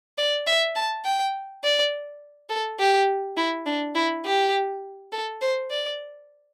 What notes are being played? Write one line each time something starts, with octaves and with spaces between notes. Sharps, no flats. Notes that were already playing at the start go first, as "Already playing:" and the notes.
D5
E5
A5
G5
D5
A4
G4
E4
D4
E4
G4
A4
C5
D5